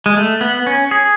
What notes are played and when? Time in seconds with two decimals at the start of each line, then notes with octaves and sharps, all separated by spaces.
0.06 G#3
0.17 A3
0.41 B3
0.67 C#4
0.91 G#4